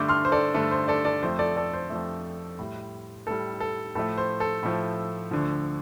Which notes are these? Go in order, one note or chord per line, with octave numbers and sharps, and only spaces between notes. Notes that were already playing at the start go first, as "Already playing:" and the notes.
Already playing: G2 D3 A3 D6 G6
C6 F6
C5
A4 D5
G2 D3 A3 A4
C5
A4 D5
A4 D5
F2 F3 A3 C5
A4 D5
A4 D5
C5
F2 F3 A3
A2 G3
A2 G3 A4
A4
A2 F3 A3 A4
C5
A4
A2 F3 A3
D2 D3 F3